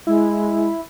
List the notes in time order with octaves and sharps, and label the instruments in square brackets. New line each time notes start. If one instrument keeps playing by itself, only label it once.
[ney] G#3 [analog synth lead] E4